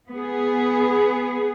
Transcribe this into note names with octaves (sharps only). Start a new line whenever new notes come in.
B3 G#4